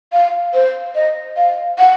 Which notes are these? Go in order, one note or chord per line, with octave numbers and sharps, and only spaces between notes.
F5
C5
D#5
F5
F#5